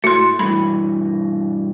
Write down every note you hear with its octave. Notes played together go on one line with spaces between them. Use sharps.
A2 A3 F#4 C6
G2 B2 E3 B5